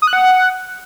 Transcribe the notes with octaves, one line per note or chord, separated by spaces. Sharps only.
D#6
F#6
F#5